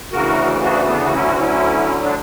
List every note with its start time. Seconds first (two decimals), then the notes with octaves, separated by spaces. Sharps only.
0.12 D2 C#3 E3 F#4 A#4
0.63 D4 F#4
0.88 B3 D4
1.04 F#4
1.14 D2 D3 F#3 C#4 E4
1.27 F#4
1.39 C#4 E4
2.04 D4